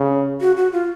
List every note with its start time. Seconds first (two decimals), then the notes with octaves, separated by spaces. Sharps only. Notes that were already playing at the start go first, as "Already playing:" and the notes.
Already playing: C#3
0.41 F#4
0.57 F#4
0.73 F4